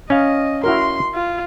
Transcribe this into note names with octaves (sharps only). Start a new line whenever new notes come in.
C#4 D#5 F5
E4 F#4 A#4 C6
F4